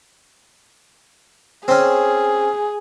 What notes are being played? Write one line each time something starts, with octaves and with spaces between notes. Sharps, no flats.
C4 C#4 G#4